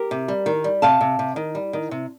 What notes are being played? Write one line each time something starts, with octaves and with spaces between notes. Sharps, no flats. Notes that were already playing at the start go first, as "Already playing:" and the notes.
Already playing: G4 A#4
C3
G3
D#3
G3
C3 F5 A5
C3
C3
D#3
G3
D#3
C3